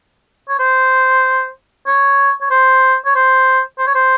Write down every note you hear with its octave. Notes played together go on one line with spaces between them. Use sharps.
C#5
C5
C#5
C#5
C5
C#5
C5
C5
C#5
C5